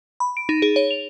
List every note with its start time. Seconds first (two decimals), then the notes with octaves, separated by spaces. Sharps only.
0.20 B5
0.37 D7
0.49 D#4
0.62 G#4
0.76 C#5
0.91 F7